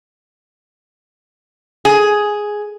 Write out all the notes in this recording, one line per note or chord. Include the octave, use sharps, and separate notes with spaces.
G#4